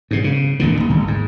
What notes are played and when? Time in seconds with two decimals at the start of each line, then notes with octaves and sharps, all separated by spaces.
0.11 G#2 B2
0.24 C#3
0.60 A1 D#2 A#2 D3
0.77 D#1 D#2
0.90 G1
1.08 G#2